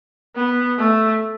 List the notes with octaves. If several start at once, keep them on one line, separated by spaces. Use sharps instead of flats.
B3
A3